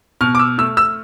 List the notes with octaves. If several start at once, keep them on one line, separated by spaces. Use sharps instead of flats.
B2 F6
D6
E6
A3 E6
E6